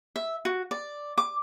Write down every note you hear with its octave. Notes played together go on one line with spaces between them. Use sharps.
E5
F#4
D5
D6